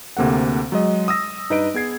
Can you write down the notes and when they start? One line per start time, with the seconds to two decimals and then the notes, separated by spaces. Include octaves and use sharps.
0.17 D2 C3 A#3 A4 F#5
0.72 F#3 G#3 D#5
1.08 D#6 E6 A#6
1.50 G2 D#4 B4 D#5 D7
1.74 B3 G#4 G#6 C7